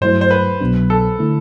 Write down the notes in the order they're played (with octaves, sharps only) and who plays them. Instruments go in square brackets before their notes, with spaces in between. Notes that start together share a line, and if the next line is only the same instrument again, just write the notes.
[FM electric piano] G2 F#3 A3 E4 [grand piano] C5
[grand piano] C5
B4
[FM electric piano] C2 B2 F#3 B3 D4
[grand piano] A4
[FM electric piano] D3 A3 E4